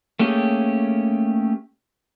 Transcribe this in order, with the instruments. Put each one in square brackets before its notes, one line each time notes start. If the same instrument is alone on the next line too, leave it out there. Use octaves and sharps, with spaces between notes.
[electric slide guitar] A3 A#3 C#4 G4 G#4